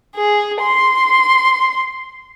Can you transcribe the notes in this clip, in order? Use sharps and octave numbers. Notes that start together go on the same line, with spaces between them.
G#4
C6